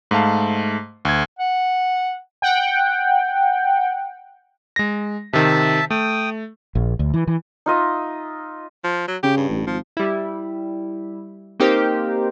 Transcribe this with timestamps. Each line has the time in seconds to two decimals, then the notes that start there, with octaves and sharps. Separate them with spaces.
0.11 G#2 A3 F5 A5
1.05 D2 G#6
1.39 F#5
2.42 F#5 G5
4.76 G#3 A#6
5.33 C3 D#3 E5 A5
5.90 A3 G5 D#6
6.75 A#1
6.99 D2
7.14 E3
7.27 E3
7.66 D#4 F4 D#5 E5
8.84 F3
9.08 F#3
9.23 C#3 G4
9.37 G2
9.49 A1
9.67 G#1 F3
9.97 G3 E4
11.59 A#3 C4 D#4 G4 A#4 C5